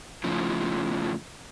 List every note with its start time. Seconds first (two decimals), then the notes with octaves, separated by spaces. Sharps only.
0.24 A2 C#3 F3